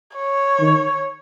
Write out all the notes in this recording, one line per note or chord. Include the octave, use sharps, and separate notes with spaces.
C#5
D#3